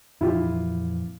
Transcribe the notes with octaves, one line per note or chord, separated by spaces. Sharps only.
F2 A#2 E3 E4 F4 G4